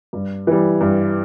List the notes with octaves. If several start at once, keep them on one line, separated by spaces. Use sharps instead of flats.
G2
E3 G3
G2